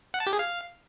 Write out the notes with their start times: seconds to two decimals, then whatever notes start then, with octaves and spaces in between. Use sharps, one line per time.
0.14 F#5
0.20 A5
0.27 G4
0.33 G#4
0.39 F5